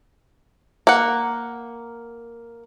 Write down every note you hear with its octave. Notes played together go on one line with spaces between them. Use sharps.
A#3 F#5